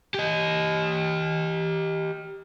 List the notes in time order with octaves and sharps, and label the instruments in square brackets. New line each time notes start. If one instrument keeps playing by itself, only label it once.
[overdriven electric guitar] G4 D#5